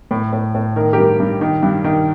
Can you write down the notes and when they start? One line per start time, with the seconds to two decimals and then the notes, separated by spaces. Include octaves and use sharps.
0.11 A2
0.33 A2
0.55 A2
0.76 D#3 A#4
0.93 G2 G4 A#4
1.20 G2
1.41 D#3
1.63 G2
1.84 D#3